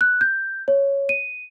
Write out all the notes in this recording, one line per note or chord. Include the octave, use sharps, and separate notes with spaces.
F#6
G6
C#5
D#7